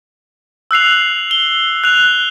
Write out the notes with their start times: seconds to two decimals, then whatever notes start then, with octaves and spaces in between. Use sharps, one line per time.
0.71 E6 F#6 C7 F7
1.31 G7
1.84 F#6 F7